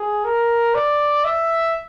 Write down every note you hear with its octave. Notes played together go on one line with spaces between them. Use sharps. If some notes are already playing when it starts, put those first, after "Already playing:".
Already playing: G#4
A#4
D5
E5